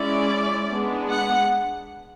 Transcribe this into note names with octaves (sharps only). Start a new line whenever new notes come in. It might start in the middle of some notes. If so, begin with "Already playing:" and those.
Already playing: G#3 C#4 E4 D5
G#3 B3 D4
F#5